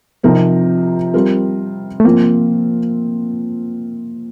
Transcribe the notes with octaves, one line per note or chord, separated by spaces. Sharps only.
C3 F3 C4 D#4 A#4
G3 C4 F4 A#4
A3
F3 A#3 C4 F4